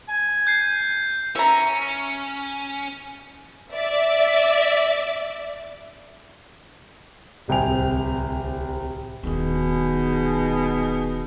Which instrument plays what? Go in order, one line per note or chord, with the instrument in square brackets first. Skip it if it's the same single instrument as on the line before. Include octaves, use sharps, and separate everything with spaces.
[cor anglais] G#5
[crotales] G6 C7
[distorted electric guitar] C#4 [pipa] E5 A#5
[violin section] D5 E5
[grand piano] D1 C2 G5 G#5 F7
[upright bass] D#1 D#3 [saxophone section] B2 D#4 G#4